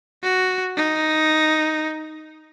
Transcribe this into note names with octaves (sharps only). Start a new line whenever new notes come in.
F#4
D#4